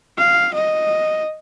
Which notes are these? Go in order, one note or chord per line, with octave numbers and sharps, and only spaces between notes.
F5
D#5